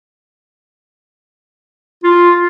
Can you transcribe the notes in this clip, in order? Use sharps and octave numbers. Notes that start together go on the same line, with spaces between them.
F4